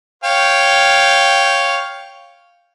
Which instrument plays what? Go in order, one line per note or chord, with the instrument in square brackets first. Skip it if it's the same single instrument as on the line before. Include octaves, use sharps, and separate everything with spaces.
[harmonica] C#5 F5 G5